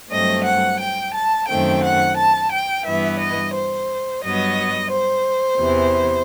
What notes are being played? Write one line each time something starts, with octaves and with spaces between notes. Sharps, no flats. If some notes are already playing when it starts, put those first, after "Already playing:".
G2 F#3 A3 C4 D#5
F#5
G5
A5
F#2 D#3 A3 C4 G5
F#5
A5
G5
G2 E3 B3 E5
D#5
C5
G2 F#3 B3 D#5
C5
E2 C3 E3